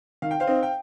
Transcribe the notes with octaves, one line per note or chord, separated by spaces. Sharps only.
D#3 F5
G5
C5 F5
C4 D#4
G5